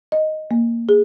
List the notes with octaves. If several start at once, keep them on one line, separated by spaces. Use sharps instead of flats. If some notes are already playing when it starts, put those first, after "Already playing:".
D#5
A#3
G#4